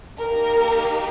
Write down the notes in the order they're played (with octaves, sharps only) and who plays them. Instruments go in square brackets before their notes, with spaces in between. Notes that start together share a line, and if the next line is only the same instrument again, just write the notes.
[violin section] A#3 D#4 G4 A#4